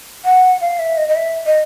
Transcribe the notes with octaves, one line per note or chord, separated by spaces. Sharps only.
F#5
F5
E5
D#5
D#5
E5
D#5